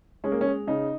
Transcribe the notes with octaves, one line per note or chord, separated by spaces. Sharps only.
G#3 C#4
A#3
C#4
G#3
C#3 D#4